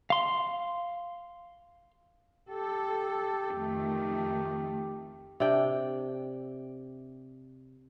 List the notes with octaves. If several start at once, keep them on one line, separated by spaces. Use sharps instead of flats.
F5 C6
G4 A4
F2 D#3 A3
C3 D4 G5